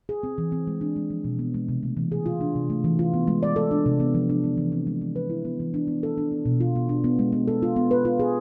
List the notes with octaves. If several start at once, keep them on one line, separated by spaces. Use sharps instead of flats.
G#4
C4
E3
C4
G#3
D4
G#3
F3
B2
B3
G#3
C3
A3
E3
G#4
F4
D4
C3
A3
E3
F4
B3
G#3
D5
A4
D4
C3
B3
F3
D4
B3
E3
C4
G#3
F3
B4
E4
B3
E3
D4
B3
A4
D4
B3
B2
F4
B3
D4
B3
G#3
B3
A4
F4
B3
B4
F4
G#4